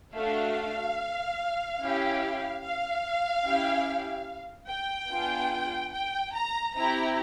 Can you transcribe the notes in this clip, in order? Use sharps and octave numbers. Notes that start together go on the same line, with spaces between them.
A3 D4 F#4 F5
C#4 E4 G4
F5
C#4 E4 G4
G5
B3 D4 F4 G#4
G5
A#5
C4 E4 G4 A#5